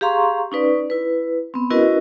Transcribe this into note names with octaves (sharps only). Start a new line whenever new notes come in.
G4 G#4 F5 A#5 C6 C#6
C#4 D#4 B4 D5
E4 B4
B3 C4
C#4 E4 F#4 A#4 B4 D#5